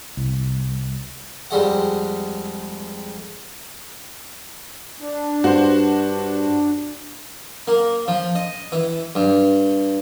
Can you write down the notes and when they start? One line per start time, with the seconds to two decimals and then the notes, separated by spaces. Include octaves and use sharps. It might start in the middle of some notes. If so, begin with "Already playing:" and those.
0.17 C2
1.51 F2 G3 G#3 F#5
5.01 D4
5.44 G2 F#4 C5
7.67 A#3
8.08 F3
8.35 D#5
8.72 E3
9.15 G2